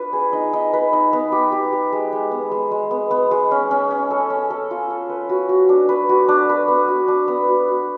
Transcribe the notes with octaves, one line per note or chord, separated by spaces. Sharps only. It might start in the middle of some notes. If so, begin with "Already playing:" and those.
Already playing: D4 F4 B4
G#4
D#4
D#4
B4
D#4
B3
G4
G4
G4
G#3
G#3
B3
G#3
G#3
B3
B3
G#3
C#4
C#4
C#4
A4
C#4
A4
F4
A4
B4
F#4
F#4
D4
B4
F#4
D4
B4
B3
F#4
D4
B3
F#4
F#4